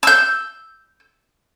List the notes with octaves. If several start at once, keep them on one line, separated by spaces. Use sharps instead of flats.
E6 G6